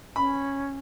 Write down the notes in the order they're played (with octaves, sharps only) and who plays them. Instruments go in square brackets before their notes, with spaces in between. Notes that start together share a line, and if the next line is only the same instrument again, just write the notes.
[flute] C#4 [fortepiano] B5